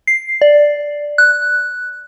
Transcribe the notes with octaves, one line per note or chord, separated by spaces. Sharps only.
C7
D5
F#6